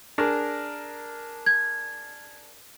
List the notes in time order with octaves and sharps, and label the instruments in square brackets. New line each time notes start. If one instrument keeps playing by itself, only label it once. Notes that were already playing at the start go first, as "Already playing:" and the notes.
[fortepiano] D4 G#4 A#4
[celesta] G#6